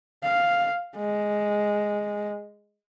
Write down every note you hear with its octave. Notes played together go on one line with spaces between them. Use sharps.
F5
G#3